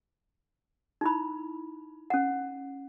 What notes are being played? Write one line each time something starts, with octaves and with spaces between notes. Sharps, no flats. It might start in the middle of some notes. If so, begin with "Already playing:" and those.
D#4 E4 B5
C#4 F#5